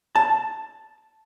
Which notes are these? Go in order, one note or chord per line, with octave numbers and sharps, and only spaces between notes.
A5